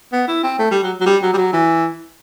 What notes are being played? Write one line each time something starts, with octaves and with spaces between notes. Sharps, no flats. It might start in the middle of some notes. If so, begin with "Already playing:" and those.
B3
E4
C4
A3
G3
F#3
F#3
G3
F#3
G3
F#3
E3